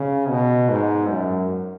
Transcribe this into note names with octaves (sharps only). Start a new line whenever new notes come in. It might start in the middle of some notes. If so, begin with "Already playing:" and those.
Already playing: C#3
B2
G#2
F#2